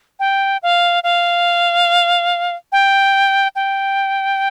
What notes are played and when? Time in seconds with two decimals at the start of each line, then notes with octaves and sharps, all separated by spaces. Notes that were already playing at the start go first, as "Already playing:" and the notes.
0.19 G5
0.63 F5
1.03 F5
2.72 G5
3.56 G5